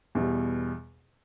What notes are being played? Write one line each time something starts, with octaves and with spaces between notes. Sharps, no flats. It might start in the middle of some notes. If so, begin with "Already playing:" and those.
E2 B2 G3